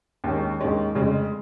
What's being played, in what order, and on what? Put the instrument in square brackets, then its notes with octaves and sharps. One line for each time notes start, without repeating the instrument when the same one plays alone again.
[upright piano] D#2 D#3 G#3 C#4
D#2 D#3 G#3 C#4
F1 F2 C#3 G#3